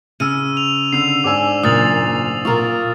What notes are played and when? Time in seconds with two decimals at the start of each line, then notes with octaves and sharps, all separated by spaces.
0.20 C#3 E6 D#7
0.57 F7
0.93 D3 E6 C7 F7
1.24 G#2 D4 G#5 D6 E6
1.63 F#1 A#2 D#6 A6 F#7
2.45 A#2 F4 A#4 C#6